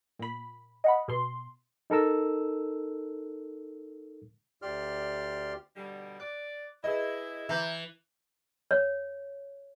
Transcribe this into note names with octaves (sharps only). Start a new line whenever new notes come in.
A#2 B5
D#5 F#5 B5
B2 C6
D#4 A4 A#4 E6
D2 G4 D5 C6 F6
B2 D3 G3
D5 F#6
E4 G#4 B4 D#5
E3 E5 A#5 G6
C#5